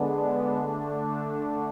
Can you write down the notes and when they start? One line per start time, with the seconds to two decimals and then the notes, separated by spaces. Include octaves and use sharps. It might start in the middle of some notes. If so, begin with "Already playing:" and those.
Already playing: D3 G#3 B3 D4
0.57 D3 A3 D4